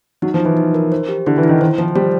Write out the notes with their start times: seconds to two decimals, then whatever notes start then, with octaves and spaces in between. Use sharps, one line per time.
0.22 F#3 D#4
0.34 F3
0.40 D#4
0.45 E3
0.57 D#4
0.74 A#4
0.92 C5
1.09 G4
1.26 D3 E4
1.38 E3
1.43 E4
1.49 D#3
1.61 D#3 C5
1.78 F3 C5
1.95 G3 C5